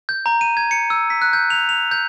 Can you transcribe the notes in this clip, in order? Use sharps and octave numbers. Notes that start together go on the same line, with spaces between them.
G6
A#5
D#7
G#6
C#7
E6
B6
F#6
G6
F7
F7
G6